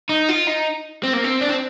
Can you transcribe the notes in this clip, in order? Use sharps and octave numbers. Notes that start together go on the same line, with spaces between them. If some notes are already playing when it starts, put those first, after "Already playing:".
D#4
F4
D#4
C4
A#3
C4
D4
C4